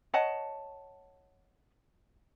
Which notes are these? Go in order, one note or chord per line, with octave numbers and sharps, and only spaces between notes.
C#5 D#5 F#5 A5